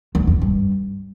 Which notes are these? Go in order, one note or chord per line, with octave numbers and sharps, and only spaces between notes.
E2
F2
G2